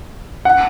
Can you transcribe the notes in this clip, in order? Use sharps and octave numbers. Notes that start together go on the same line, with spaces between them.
F#5